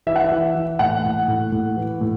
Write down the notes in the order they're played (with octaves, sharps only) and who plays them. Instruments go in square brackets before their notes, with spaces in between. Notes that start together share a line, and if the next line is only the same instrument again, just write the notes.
[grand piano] E3 E5
F#5
E5
E3
E3
A2 F#5
A2
A2
A2
E3
A2